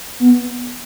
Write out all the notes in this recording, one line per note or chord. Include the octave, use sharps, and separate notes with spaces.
B3